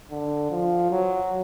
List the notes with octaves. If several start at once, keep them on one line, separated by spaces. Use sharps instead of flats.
D3
F3
F#3